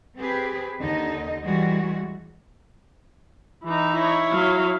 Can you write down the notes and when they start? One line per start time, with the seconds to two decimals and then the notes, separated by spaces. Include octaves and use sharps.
0.18 C4 G4 G#4 B4
0.81 D#2 D3 D#4 D#5
1.44 E3 G3 G#3 F#4
3.64 E3 D#4
3.93 E4 C#5
4.32 F#3 F5